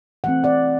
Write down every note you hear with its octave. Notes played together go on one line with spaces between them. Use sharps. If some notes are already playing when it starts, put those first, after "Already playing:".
E3 A3 C4 F#5
D5 F#5